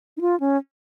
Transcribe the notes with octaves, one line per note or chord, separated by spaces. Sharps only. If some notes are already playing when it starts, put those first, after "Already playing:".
D#4
F4
C#4